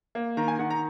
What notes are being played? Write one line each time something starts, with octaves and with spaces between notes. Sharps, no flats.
A#3
D#3 A#5
G#5
D#3 F#5
A#5